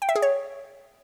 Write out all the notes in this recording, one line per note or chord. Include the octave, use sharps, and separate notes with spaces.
G5
E5
G#4
C#5